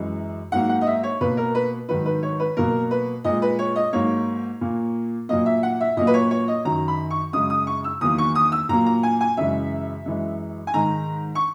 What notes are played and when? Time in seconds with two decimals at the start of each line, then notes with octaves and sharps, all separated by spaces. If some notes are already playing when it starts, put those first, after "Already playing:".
Already playing: F#2 E3 G#3
0.52 G#2 F#3 A#3 F#5
0.69 F#5
0.81 D#5
0.87 E5
1.03 C#5
1.21 B2 A#3 B4
1.37 A#4
1.55 B4
1.89 G#2 D#3 F#3 B4
2.06 B4
2.23 C#5
2.40 B4
2.57 B2 F#3 A#3 A#4
2.91 B4
3.24 A#2 G#3 D#5
3.42 B4
3.59 C#5
3.76 D#5
3.93 G#2 F#3 A#3 C#5
4.61 A#2 A#3
5.29 A#2 F#3 A#3 D#5
5.46 E5
5.63 F#5
5.80 E5
5.97 A#2 F#3 A#3 D#5
6.07 B4
6.14 C#5
6.31 C#5
6.48 D#5
6.65 F#2 D#3 F#3 A#5
6.88 B5
7.11 C#6
7.33 F#2 C#3 G#3 D#6
7.50 D#6
7.67 C#6
7.84 E6
8.01 E2 D#3 F#3 A#3 D#6
8.18 C#6
8.35 D#6
8.52 E6
8.69 A#2 F#3 A#3 A#5
8.86 A#5
9.03 G#5
9.21 G#5
9.37 F#2 C#3 E3 G#3 E5
10.06 F#2 E3 G#3
10.67 G#5
10.74 G#2 D#3 G#3 A#5
11.35 C#6